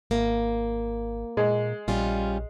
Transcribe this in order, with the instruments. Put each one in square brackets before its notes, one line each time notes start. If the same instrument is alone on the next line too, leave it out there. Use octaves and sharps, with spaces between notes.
[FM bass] G#1 [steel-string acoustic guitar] A#3
[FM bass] A#2 [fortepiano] G#3
[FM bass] A#1 [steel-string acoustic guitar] G3 C#4 F4